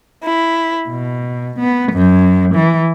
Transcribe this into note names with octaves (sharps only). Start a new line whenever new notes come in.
E4
B2
B3
F#2
E3